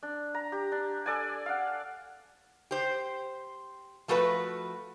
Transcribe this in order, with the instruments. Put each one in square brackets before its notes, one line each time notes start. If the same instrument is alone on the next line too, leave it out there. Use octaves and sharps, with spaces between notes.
[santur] D4
A#5
G4
D4
A4 D5 G#5
F5 F#5
[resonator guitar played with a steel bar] G4 C5
F3 A3 F#4 A4 B4